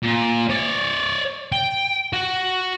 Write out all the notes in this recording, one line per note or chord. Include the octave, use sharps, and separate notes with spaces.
A#2
C#5 D5
G5
F#4